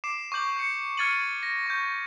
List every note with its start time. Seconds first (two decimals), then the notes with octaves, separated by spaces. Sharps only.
0.04 D6 C7 D7 E7
0.32 C#6 D6 G6 F#7
0.56 G6 C#7
0.97 F6 G#6 A6 C#7 D#7 F#7
1.43 A#6
1.66 C#6 G6